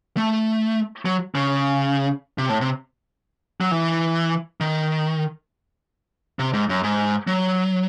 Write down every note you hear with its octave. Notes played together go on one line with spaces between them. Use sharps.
A3
F#3
C#3
C3
A2
C3
F#3
E3
D#3
C3
G#2
F#2
G#2
F#3